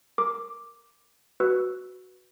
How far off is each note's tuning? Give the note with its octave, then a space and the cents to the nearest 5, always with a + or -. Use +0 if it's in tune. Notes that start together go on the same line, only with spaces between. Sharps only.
A#4 +0 D6 +0
F#4 +0 B4 +0 E6 +0